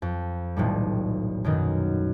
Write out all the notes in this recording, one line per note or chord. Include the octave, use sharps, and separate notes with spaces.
F2
D#1 B1 A2 G3
F#2 B2 D#3